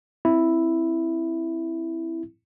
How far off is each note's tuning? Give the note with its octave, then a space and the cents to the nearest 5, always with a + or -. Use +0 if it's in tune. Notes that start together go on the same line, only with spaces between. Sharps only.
C4 +0 E4 +0